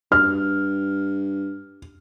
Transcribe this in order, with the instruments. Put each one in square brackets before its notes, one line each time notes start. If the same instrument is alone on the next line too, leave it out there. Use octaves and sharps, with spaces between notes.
[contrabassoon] G2 [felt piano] F6